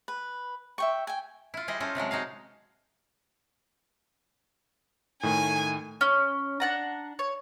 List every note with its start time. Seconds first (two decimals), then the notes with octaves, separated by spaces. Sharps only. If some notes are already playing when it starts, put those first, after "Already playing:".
0.08 B4
0.78 E5 G5 C#6
1.07 G5 G#5
1.54 E4 F4
1.68 G3 E4 G#4 C5 D#5
1.80 C#4 F4 A4 C5 D#5
1.95 C3 F3 F#3 G#3
2.11 D#4 F#4 G#4 F5
5.23 A2 D#3 A3 G#5
6.01 C#4
6.60 D4 F#5 A#5
7.19 C#5